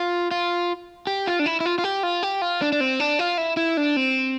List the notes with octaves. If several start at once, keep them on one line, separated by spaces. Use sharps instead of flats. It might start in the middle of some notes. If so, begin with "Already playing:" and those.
Already playing: F4
F4
G4
F4
D4
E4
E4
F4
F4
G4
F4
G4
F4
D4
D4
C4
D4
F4
E4
E4
D4
C4